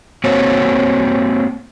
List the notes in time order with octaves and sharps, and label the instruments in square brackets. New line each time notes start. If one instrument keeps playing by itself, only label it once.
[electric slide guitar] A#3 C4 F#4 C#5